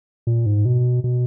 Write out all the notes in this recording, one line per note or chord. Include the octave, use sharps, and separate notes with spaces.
A#2
G#2
B2
B2